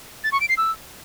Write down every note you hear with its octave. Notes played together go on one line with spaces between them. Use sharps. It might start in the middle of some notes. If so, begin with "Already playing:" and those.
A6
C#6
D7
C7
E6